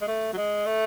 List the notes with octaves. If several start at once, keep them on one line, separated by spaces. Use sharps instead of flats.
G#3
A3
F#3
G#3
A3